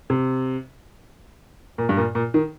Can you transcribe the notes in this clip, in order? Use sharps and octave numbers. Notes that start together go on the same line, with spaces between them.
C3
A#2
G2
A#2
A#2
D#3